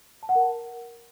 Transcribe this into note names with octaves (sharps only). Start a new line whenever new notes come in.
A5
F#5
A#4